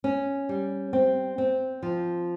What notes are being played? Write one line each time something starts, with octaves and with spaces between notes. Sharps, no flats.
C#4
G3
C4
C4
F3